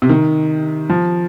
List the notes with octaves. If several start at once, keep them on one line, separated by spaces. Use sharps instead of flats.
C3
D#3
F3